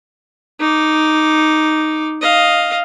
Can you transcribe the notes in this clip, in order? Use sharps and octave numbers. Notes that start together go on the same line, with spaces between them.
D#4 D6
D#5 F5